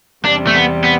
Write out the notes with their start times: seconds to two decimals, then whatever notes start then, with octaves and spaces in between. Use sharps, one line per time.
0.25 E2 C3 G3 D4
0.47 A3
0.55 B3
0.84 B3